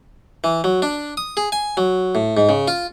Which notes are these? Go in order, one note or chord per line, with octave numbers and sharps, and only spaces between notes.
E3
F#3
D4
D#6
G#4
G#5
F#3
A2
G#2
C#3
F4